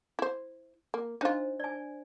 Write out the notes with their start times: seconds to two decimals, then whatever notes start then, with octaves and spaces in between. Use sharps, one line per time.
0.19 E4 C5
0.94 A#3
1.21 D4 D#4 F4 C5
1.60 D5 G#5